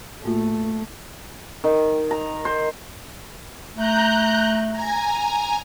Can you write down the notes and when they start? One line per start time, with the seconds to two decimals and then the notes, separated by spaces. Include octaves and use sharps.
0.24 A2 A3 A#3 F4
1.64 D#3
2.11 A#5
2.45 C5
3.76 A3 A#5 F#6 G6
4.72 G#5 A#5